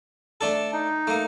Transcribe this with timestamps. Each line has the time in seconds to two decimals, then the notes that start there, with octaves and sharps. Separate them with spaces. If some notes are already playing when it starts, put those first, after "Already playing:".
0.41 A3 D4 A4 A5
0.73 D#4
1.07 A3 A#3